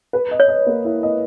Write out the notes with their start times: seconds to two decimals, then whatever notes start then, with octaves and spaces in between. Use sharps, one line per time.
0.13 B4
0.31 D#5
0.40 C#5
0.48 D#5
0.66 A#3
0.85 E4
1.03 D#5